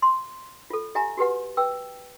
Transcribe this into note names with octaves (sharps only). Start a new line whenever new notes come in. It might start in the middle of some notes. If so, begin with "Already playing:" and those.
C6
F4 A4
G4 E5 G#5 A#5
F#4 G4 B4 F#5
B4 G5 E6